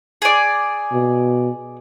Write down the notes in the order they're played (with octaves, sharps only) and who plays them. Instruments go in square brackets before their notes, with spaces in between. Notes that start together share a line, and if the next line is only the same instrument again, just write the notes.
[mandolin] G#4 D5
[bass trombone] B2